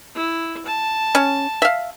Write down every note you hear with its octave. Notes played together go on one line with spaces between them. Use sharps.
E4
A5
C#4
E5 F5